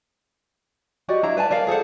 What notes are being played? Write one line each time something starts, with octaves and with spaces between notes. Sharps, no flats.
F#4 G4 D5 D#5
D4 E4 F5 A#5
B4 D5 G5 A5
A#4 D5 F5
G#4 A4 C5 F#5